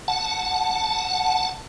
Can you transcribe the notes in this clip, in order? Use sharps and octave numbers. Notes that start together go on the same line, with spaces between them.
F#5 A5